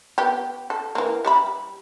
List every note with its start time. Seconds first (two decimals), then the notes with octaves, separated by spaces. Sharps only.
0.18 B3 G4
0.70 A4
0.95 E3 A#3
1.25 G3 E5 B5